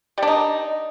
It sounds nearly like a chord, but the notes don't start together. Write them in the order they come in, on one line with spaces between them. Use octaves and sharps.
G3 D4 D#4